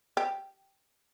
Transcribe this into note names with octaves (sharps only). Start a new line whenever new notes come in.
G4